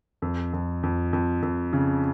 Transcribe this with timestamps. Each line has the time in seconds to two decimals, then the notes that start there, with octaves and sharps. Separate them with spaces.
0.22 F2
0.53 F2
0.83 F2
1.13 F2
1.42 F2
1.73 C#3